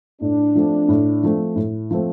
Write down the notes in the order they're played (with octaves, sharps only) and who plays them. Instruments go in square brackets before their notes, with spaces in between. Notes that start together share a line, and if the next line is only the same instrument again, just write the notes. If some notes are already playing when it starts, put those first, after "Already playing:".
[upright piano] A2 [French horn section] D4
[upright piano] F3 A3 C4
A2
F3 A3 C4
A2
F3 A3 C4